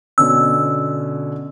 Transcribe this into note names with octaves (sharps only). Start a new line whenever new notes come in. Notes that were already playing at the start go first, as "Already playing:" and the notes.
B2 D3 C#4 E6